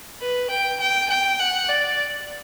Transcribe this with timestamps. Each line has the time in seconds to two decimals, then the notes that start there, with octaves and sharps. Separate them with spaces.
0.22 B4
0.51 G5
0.80 G5
1.10 G5
1.40 F#5
1.69 D5